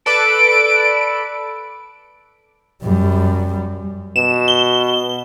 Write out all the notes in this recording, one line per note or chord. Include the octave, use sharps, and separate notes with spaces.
A4 B4 D5 D7
F#2 G3
B2 E7
G7